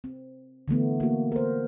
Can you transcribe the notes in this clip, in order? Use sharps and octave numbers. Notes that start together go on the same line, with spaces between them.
C4
D3 E3 A3 B3
A#3 F#4
A#4 C5